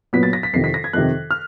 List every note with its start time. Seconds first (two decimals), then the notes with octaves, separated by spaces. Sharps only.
0.13 A#2 F#3 B3 B6
0.23 A6
0.33 A#6
0.43 B6
0.53 F2 C3 D#3 C7
0.64 B6
0.74 A#6
0.84 G#6
0.93 F2 C3 D#3 F#6
1.31 F6